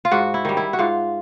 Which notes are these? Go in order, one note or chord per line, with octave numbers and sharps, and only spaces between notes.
F4
G#2 F#4
E4
D#3 G3
E4
F#4
G#2 F4